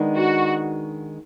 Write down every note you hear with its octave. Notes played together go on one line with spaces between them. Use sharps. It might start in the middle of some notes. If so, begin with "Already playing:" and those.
Already playing: D#3 G#3 B3 D4
F#4